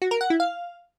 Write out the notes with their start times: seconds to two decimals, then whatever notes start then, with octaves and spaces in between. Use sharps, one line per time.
0.02 F#4
0.11 A#4
0.21 F#5
0.30 E4
0.40 F5